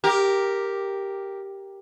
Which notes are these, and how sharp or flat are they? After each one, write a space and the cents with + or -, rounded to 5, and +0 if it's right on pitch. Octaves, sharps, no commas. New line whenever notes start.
G4 +0 A#4 +0